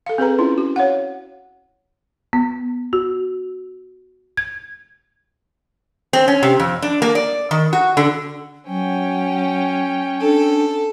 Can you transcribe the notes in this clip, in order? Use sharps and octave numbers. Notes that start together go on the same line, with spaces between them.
A4 F5
C4 G#4 B4 A#5
C#4 E4 F4
F#4
C#5 F5 F#5
B3
F#4
G#6
C4
C#4
C3
F2
D4
A#3
D5
D#3
F#4
D3
F#3 C#4 G5
D4 A4